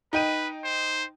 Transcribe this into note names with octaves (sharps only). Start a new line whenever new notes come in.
D#4 B4 G5 D#7
C5